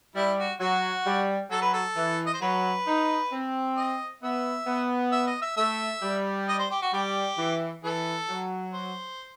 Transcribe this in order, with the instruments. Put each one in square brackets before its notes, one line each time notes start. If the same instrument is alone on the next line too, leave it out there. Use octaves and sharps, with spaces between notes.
[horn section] G3 [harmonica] E4
[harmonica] F#4
[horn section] F#3 [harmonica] F#4
[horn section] G3
[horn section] F#3 [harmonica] A4
[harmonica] B4
A4
[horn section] E3
[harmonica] D#5
C5
[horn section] F#3 [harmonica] B4
[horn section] D#4
C4
[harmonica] D#5
[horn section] B3 [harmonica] E5
[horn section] B3
[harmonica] E5
D#5
E5
[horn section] A3 [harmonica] E5
[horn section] G3
[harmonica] D#5
C5
G4
F#4
[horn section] G3 [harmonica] G4
[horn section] E3
[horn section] E3 [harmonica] A4
[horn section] F#3
[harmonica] C5